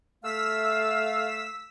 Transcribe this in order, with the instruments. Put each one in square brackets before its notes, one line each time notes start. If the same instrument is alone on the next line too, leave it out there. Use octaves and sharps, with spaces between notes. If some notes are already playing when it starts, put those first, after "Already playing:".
[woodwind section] A3 F5 [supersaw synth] E6 B6